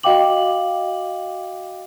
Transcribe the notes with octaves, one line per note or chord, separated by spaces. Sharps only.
F#4 D#5 F5 G5 D6 F#7